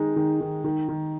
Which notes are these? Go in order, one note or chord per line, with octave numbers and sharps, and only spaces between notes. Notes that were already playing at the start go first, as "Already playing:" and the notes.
Already playing: D#3 G#3 D#4
D#3
D#3
D#3
D#3